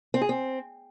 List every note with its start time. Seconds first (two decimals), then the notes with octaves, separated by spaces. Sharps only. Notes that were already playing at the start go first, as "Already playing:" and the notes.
0.14 C4
0.22 G#4
0.29 C4